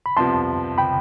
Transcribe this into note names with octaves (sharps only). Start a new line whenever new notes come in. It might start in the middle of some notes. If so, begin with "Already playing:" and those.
B5
C2 C3 F3 B3 A5 C6
G5 B5